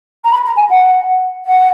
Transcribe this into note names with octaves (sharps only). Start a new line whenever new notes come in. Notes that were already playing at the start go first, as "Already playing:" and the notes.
A#5
B5
A#5
G#5
F#5
F#5